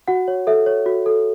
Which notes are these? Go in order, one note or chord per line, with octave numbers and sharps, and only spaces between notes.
F#4 F#5
C#5
A4 E5
C#5
F#4
A4